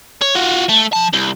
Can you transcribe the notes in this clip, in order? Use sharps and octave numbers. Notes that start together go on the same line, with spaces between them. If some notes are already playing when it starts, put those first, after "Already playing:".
C#5
F4 F#4
A3
F3 A5
C2